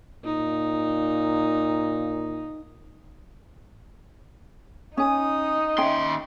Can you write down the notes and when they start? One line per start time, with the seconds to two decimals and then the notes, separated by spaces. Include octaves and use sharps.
0.24 A#2 D#4
4.97 C#4 D#4 G#5 D#6
5.78 D#2 C#4 E5 G5 C6